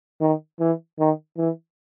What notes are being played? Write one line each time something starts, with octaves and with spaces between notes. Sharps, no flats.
D#3
E3
D#3
E3